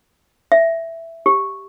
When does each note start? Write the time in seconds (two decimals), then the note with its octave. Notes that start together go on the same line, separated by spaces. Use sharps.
0.52 E5
1.26 G4